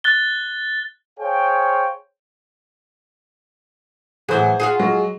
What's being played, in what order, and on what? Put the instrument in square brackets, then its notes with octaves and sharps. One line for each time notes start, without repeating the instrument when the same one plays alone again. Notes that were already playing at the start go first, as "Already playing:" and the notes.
[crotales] F#6 A6 G7
[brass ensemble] G#4 C5 C#5 F5 G5
[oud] A2 E3 F#3 [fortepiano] G#4 C5
[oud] F4 F#4 G#4
[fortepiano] F#3 G#3